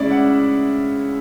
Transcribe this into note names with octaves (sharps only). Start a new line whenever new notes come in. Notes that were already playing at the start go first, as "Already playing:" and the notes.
Already playing: C#3 G#3 C#4 E4 D5 E5
F#5